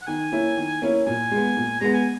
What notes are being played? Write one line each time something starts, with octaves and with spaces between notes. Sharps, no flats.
F#5
D#3 G#5
A#3 C#4 E4
D#3
A#3 C#4 E4
A#2 G#5
G#3 B3
A#2
G#3 B3 A#5
G#5